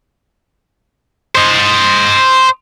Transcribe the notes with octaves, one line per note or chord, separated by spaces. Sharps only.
C5 D#5